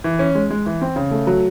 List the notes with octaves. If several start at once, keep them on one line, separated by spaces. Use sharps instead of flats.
E3
C#4
G#3
G#3
E3
C4
C#3
A3
F#3